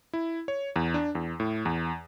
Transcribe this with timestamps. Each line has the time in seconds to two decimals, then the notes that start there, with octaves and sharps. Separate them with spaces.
0.13 E4
0.48 C#5
0.76 E2
0.94 D4
1.15 E2
1.40 A2
1.65 E2